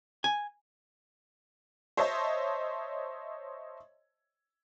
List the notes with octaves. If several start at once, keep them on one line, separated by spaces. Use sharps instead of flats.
G#5
C5 C#5 D#5 E5 A5 C6